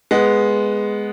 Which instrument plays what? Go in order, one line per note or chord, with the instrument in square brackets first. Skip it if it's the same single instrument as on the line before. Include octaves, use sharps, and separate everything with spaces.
[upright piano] G#3 B3